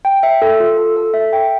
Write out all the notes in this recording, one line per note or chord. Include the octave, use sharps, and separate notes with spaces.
G5
E5
A4
F4
A4
A4
E5
G5